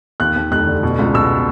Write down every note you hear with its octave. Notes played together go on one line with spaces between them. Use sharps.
D#2 F#6
D#2
F1 F#6
D3
B2
C#2
B2 E6